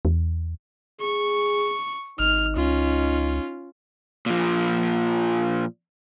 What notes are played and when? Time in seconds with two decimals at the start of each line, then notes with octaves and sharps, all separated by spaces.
0.05 E2
1.01 G#4 C#6
2.19 G#1 D#4 F6
2.56 C#2 C#4 F4
4.26 A#2 F3